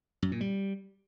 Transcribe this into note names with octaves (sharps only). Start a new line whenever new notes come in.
F#2
A#2
G3